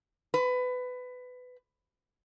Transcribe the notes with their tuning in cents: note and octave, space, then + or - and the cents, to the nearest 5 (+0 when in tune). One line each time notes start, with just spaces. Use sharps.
B4 +20